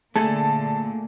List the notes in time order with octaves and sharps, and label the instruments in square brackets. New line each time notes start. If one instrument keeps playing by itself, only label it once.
[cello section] A#2 D3 A#3 [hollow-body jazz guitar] A3 G#4 A4 [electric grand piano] A5